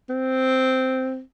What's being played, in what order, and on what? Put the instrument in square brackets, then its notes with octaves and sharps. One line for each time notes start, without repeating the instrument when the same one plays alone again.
[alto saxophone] C4